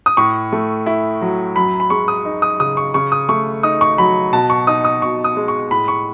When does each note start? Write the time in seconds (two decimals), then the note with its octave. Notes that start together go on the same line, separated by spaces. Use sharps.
0.06 D#6
0.17 A2 C#6
0.52 A3
0.86 E4
1.21 F#3
1.56 F#2 B5
1.80 B5
1.90 G#3 C#6
2.08 D#6
2.25 D#4
2.42 D#6
2.60 C#3 D#6
2.77 C#6
2.94 C#3 C#6
3.12 D#6
3.29 A3 C#6
3.63 D#4 D#6
3.81 C#6
3.98 F#3 B5
4.33 B2 A5
4.50 C#6
4.67 D#4 D#6
4.85 D#6
5.02 B2 C#6
5.24 D#6
5.37 G#3
5.48 C#6
5.71 A2 B5
5.88 C#6